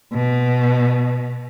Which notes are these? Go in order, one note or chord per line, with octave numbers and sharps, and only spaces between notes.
B2